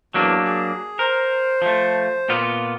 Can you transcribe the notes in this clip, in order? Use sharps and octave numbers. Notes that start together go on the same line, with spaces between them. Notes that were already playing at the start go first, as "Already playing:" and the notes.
E2 F#3 A#3 D4
G#4
A#4 C5
F3 A3
A#2 B3 F4